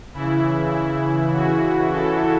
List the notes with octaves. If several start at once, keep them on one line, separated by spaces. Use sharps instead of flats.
C#3 E3 E4
E4
F#4
A4